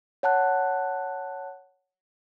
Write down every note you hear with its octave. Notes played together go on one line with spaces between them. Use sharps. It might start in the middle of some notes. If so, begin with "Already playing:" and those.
C#5 F#5 A5 F#6